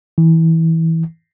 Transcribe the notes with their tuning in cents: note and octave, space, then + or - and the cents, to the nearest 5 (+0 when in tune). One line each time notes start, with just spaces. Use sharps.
E3 -20